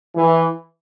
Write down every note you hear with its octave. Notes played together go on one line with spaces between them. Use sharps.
E3